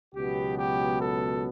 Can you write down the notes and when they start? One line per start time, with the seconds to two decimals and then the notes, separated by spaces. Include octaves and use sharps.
0.15 C#2 B2 F#3 B3 G4
0.58 G4
1.01 A4